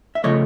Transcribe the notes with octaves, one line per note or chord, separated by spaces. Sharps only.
E5
C#3 F3 A3 C#5 D#5